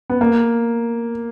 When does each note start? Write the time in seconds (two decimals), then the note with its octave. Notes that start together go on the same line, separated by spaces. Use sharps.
0.10 B3
0.21 A#3